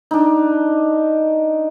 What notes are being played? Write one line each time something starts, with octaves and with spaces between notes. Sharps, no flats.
D4 D#4